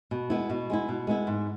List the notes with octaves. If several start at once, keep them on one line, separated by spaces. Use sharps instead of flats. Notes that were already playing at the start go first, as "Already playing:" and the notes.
B2
G#3 B3 E4
B2
G#3 B3 E4
B2
G#3 B3 E4
G#2